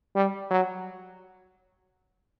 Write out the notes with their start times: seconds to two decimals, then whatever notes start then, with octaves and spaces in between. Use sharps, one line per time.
0.16 G3
0.50 F#3